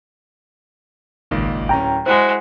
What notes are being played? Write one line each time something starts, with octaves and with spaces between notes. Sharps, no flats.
G#1 C#2 A#2 D#3
D1 C#4 G5 A#5
G#3 E4 F#4 C5 F#6